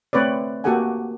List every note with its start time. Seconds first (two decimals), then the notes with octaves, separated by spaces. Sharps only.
0.13 A3 C4 B4 C#5 D5
0.64 A#3 F#4 G4 A4 F#5 G#5